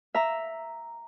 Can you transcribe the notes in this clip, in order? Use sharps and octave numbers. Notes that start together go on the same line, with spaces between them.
E5 A#5